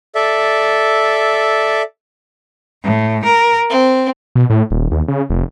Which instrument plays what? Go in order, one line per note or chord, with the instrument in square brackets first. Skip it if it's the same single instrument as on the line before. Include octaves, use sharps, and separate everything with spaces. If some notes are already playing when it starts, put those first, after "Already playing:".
[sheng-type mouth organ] A4 D5 E5
[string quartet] A2
A#4
C4
[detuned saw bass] B2
A2
D#1
D#2
C#3
F1